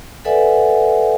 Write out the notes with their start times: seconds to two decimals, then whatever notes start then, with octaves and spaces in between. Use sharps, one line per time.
0.25 A4 B4 D5 E5 F#5 G#5